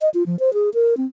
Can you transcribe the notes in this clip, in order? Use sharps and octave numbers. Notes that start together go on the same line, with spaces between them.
D#5
F4
F3
C5
G#4
A#4
C4